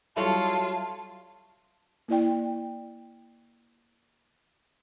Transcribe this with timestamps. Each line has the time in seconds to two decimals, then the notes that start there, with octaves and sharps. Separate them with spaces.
0.17 F#3 G3 E4 F4 A4 C#5 A5
2.08 A#3 E4 D5 G5